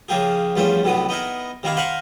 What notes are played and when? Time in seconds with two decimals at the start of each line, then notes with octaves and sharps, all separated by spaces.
0.09 C#3 F3 A#3 G4 G#4
0.56 E2 G2 F3 A3 C#4 C5
0.83 B1 A2 C3 B3 D#6
1.09 B3 D#4 E4 A#4
1.63 C3 D#3 A#3 E4 F5
1.77 A#4 C5 F5 F#5 G#5 B5